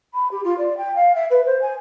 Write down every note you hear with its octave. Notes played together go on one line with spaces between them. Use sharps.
B5
G4
F4
D5
G5
F5
E5
B4
C5
G#5